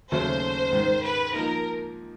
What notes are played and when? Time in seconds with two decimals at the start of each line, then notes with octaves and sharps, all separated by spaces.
0.11 D#2 C#3 F#3 A3 C5
0.72 G#2 D#3 G#3
1.03 B4
1.33 F3 A#3 D#4 A#4